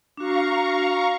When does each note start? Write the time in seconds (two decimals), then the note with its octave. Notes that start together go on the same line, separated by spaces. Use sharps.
0.17 D4 F#4 F5 A#5 C#6